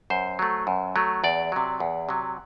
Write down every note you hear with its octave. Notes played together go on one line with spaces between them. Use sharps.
F#2 C5
F#3 A3
F#2
F#3 A3
E2 D5
C3 F#3
E2
C3 F#3